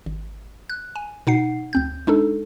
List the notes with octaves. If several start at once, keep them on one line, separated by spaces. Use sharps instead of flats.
G#1
F#6
G#5
B2 D#4 F#5 C7
D2 C4 G6
G#3 D4 D#4 A4